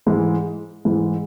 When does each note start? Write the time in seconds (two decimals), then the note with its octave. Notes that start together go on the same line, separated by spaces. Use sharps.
0.06 G#2 E3 G#3
0.85 G#2 E3 G#3